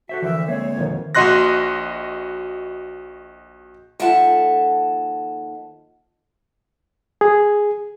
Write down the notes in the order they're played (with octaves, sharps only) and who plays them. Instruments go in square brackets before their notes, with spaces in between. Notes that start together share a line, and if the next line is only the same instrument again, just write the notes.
[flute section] F#4 [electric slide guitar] A4 C5 E5
[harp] D2 F3 [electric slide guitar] E3 A#4 [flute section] E5
[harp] G#3 A4 E5 [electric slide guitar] A#3 C4 [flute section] C#5
[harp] F2 B2 D#3
[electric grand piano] A#1 F#4 D#5 C6 F#6 A#6
[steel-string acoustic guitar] D#2 F3 A4 E5 F#5 A5
[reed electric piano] G#4